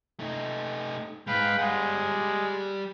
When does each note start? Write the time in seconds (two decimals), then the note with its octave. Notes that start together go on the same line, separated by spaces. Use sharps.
0.20 A3 D#4
1.27 G#2 G#3 B4 F5 G5
1.59 G3 G#3 F#5